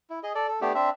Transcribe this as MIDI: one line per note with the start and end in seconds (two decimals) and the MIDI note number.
0.10 0.19 64
0.23 0.33 68
0.23 0.33 75
0.35 0.47 69
0.35 0.47 74
0.48 0.60 69
0.61 0.72 57
0.61 0.72 59
0.61 0.72 62
0.61 0.72 67
0.75 0.90 60
0.75 0.90 62
0.75 0.90 76